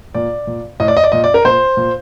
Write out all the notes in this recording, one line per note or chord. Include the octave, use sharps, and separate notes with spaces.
A#2 D5
A#2
A2 D#5
D5
D#5
D5
A#2 D#5
D5
A#4
A#2 C5
A#2